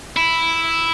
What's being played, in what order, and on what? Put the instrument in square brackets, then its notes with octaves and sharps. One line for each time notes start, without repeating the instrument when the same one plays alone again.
[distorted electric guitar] E4